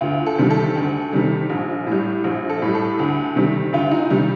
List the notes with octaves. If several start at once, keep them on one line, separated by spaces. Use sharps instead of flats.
D2 F4
A4
C3 D#3 G3
A4
D2
C3 D#3 G3
A#1
A2 G3
A#1
A4
A2 G3
A4
D2
C3 D#3 G3
D2 F4
D#4
C3 D#3 G3